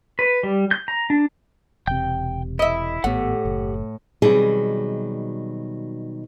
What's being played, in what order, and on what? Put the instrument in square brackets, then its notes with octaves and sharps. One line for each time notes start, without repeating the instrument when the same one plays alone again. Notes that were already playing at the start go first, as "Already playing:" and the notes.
[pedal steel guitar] B4
G3
G6
A#5
D4
[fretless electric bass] E1 C3 [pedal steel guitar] G5 G6
[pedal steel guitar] E4 [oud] D#5 E5
[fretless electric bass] G#1 B3 [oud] A2 [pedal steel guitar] G4 F#5
[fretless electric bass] F#1
[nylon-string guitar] B2 D#3 F#3 G3 C4 G#4